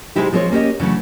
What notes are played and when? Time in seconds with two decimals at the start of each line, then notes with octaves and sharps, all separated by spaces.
0.16 C3 G#3 D#4 E4 G4
0.32 F3 G#3 C4 A#4 C#5
0.51 A#3 C#4 G4 D#5
0.80 C#3 E3 F#3 A3